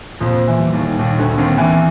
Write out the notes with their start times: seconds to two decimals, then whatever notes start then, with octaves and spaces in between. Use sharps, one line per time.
0.21 F2 A#2 F3
0.47 E2 E3
0.60 G3
0.73 D#2 D#3
0.99 D#2 A#2 D#3
1.18 D2 D3
1.38 D#2 D#3 C4
1.58 E2 E3